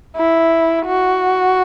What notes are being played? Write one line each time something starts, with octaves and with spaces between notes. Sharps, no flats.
E4
F#4